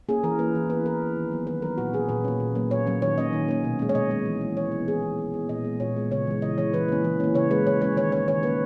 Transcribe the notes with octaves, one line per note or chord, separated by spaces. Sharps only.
A#3 C#4 G#4
E3 A#4
A#3 C#4 B4
E3
B3 B4
E3 A#4
B3
D#3
F#3 B3
D#3 B4
F#3 B3 A#4
A#2 F#4
A#3 C#4 G#4
A#2 B4
A#3 C#4
A#2
F#3 A#3 C#4
A#2 C#5
F#3 A#3 C#4
D#3 C#5
A#3 C#4 D#5
D#3
A#3 C#4
B2
G#3 C#4
C#5
B2 D#5
G#3 C#4
E3
B3
E3 C#5
B3
E3 G#4
B3
E3
B3
A#2 D#5
G#3 B3
A#2 C#5
G#3 B3
C#3 C#5
E3 G#3
C#3 D#5
E3 G#3 C#5
E3 B4
A#3 C#4
E3
A#3 C#4
C#3 C#5
G#3 C#4 B4
C#3 C#5
G#3 C#4 C#5
D#3 C#5
A#3 C#4 C#5
D#3 C#5
A#3 C#4 B4